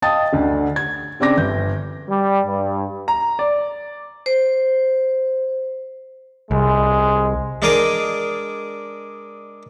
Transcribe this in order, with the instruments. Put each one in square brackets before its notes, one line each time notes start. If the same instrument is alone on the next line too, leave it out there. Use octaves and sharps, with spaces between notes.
[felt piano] D#5 F5 G5 A5 D#6 A6
D2 D3
G#6
C#3 C4 D4 D6 A#6
G1 G6
[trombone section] G3
G2
[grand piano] A#5
D5
[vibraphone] C5
[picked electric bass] C2 [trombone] G#3
[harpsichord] G#3 D4 G#4 A#4 D#5 D6